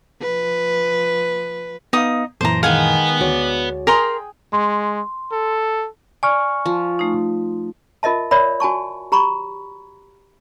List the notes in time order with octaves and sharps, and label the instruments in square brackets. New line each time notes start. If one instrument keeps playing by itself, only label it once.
[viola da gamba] F3 B4
[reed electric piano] B3 F5 [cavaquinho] D#4 D#6
[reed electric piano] F#2 A#2 E3 [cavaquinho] C5 A#5 [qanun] A5 D6
[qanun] D#3 G#3 [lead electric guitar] B4 F#5 [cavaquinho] F5 G#5
[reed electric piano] D2 F#4 C#5 [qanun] D5
[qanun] G#4 G5 [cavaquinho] A#4 A#5 C6
[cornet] G#3 [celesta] C6
[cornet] A4
[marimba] D5 [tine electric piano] G#5 C#6 F6
[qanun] F3
[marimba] A3 D#4
[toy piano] F4 A#4 D#5 E5 A5
A#4 C#5 D5 E5 B5
F#4 G#5 A5 C#6
G4 A#5 B5 C#6